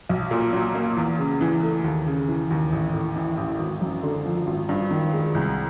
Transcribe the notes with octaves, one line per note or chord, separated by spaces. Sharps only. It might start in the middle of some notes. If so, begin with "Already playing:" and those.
B1
A#2
F#3
A#3
E2
C#3
E3
A3
D#2
C#3
E3
D#2
A1
A2
E3
A1
G#1
F#2
D3
F3
G#1
G2
D#3
G#3
C2